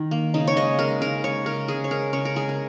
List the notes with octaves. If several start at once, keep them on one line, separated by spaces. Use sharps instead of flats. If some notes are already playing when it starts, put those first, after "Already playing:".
Already playing: D#3
A#3
C#3 D#4
C#5
G#3 D#5
G#3 A#4
C#3 A#4
G#3 C#5
C#3 A#4
G#3 G#4
C#5
G#3 A#4
C#3 C#5
A#4
G#3 G#4
A#4